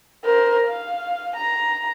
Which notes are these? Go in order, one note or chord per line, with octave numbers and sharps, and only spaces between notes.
A#4 C5
F5
A#5